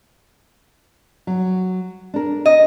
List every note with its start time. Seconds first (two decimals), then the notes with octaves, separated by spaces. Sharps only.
1.27 F#3
2.14 D4 A#4
2.46 D#5